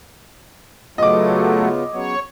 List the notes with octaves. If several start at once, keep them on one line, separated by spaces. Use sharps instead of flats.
C#3 F#3 A3 B3 F4 D#5 D6
C#3 F#3 B3 C#5